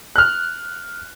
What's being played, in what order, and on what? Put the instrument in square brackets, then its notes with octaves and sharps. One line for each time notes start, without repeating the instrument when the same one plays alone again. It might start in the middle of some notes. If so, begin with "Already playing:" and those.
[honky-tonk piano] F6 F#6